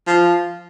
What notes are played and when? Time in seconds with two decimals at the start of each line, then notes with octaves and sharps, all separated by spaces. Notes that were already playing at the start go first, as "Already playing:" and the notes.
0.07 F3